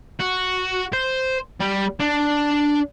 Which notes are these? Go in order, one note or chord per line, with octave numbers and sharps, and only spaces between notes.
F#4
C5
G3
D4